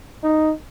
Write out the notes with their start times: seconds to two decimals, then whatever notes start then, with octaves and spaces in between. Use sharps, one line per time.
0.24 D#4